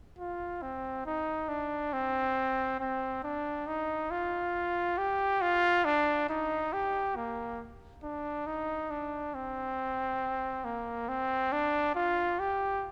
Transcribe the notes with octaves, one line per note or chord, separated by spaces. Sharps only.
F4
C4
D#4
D4
C4
C4
D4
D#4
F4
G4
F4
D4
D#4
G4
A#3
D4
D#4
D4
C4
A#3
C4
D4
F4
G4